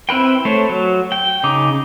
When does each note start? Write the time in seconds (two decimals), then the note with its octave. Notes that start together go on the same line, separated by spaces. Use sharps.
0.09 C4 E4 B4 G5
0.45 A3 C5 C#5
0.69 F#3
1.12 G5
1.43 C#3 D#4 D6